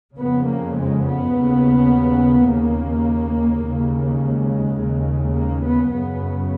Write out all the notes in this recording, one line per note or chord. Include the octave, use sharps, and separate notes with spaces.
F2 C#3 B3
A#3
G#3
B3
D#2 C#3
D#2 C#3 A#3
D#2 C#3
G#3
D#2 C#3
A#3
B3
F#2 C#3 B3